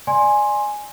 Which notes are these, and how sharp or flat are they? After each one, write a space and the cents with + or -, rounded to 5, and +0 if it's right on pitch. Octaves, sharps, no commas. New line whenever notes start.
D5 +15 G#5 +0 C6 +15